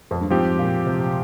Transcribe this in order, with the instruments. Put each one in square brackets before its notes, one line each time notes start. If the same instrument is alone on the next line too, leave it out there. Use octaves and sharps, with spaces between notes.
[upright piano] F2
G2
[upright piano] G#2 [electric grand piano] F3 C4 G4
[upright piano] A#2
C3